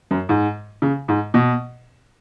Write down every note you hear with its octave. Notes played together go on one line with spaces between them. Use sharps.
F#2
G#2
C#3
G#2
B2